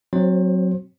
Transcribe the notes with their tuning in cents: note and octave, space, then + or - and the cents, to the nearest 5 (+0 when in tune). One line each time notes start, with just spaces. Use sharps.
F#3 +0 C4 +0 C5 +25